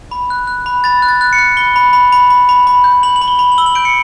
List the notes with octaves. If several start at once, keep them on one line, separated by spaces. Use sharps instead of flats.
B5
F#6
F#6
B5
B5 A6
F#6
A6
F#6
C#7
F#6
B5 G7
B5
B5
B5
B5
B5
B5
G6
B5 F#7
F#7
B5
G7
B5
F#7
E6 G7
F#7
G6 D7
C#7